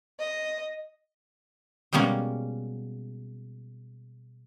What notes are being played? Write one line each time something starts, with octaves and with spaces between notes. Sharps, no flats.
D#5
B2 G3 G#3 A#3 C#4